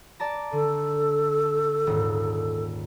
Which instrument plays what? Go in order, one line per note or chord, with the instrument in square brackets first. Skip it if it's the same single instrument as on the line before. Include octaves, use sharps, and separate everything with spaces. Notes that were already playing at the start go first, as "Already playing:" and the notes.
[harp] D5 A5 A#5
[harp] D3 [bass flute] A4
[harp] D#1 G#2 D#4